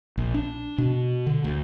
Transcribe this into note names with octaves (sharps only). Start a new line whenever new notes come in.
A#1
D4
B2
D3
D2